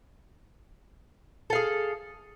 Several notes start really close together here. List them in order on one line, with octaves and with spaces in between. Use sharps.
A4 F5 G#4